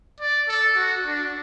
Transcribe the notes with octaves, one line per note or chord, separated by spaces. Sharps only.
D5
A4
F#4
D4